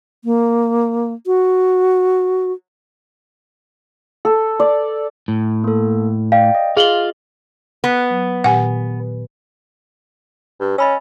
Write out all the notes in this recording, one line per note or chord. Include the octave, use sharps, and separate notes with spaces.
A#3
F#4
A4
D5
A2
A#3 A4
D5 F5 G5
D#5
F4 G#4 F5 F#7 G7
B3
F#3
A#2 D#3 G4 F#5 G#5
G2
C#4 D#5 B5 E6